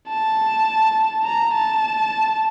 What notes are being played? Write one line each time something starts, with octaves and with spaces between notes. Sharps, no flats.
A5
A#5
A5